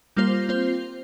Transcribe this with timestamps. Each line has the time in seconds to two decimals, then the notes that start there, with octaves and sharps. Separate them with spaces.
0.16 G3 A#3 F4 C5
0.49 C4 F4 C5